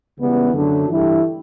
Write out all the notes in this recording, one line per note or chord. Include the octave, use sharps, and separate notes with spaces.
C#2 C#3 E3 G3 B3
F#2 D3 F#3 A3 D4
G2 E3 A3 E4 G4